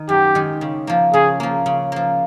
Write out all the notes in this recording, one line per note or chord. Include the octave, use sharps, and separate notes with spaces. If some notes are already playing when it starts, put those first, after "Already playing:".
Already playing: D#3
F#2 G4
D#3 G#3
C#3
F3 A#3
C#3 G#4
F3 A#3
C#3
F3 A#3